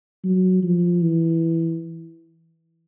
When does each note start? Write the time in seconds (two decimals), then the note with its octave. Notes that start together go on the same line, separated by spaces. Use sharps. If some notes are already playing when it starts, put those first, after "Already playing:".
0.24 F#3
0.63 F3
1.02 E3